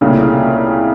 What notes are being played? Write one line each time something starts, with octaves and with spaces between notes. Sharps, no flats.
C2 A#2 C#3 A3